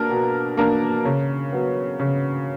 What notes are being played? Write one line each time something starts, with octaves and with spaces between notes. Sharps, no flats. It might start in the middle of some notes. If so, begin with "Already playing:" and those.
Already playing: B2 A#3 D4 A#4
B2
A#3 D4 A#4
C#3
F#3 B3
C#3